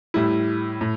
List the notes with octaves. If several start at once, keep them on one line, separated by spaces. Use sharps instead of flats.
A2 G3 E4
A2